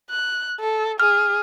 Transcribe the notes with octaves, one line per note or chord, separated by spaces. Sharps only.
F#6
A4
G#4 F6